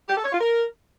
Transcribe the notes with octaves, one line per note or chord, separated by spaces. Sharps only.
G4
A4
C#5
F4
A#4